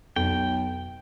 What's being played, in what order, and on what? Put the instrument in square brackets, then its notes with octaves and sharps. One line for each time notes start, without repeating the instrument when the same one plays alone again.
[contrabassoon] B1 [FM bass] F2 [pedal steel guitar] G5